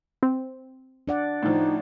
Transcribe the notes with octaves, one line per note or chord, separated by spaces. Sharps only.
C4
D4 D5 F#5
A2 F3 D#4